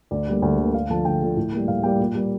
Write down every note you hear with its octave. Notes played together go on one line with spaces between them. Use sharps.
D2 D5
D3 G3 A#3
D2
D3 G3 A#3
D2 F5
D3 F3 A3 A5
D2 G5
D3 F3 A3
A2
G3 A#3
A2 F5
G3 A#3 G5
A#2
G3 A#3